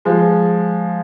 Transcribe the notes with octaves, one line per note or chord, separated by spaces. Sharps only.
F3 G#3